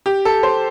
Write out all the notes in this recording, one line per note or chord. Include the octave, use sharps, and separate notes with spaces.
G4
A4
C5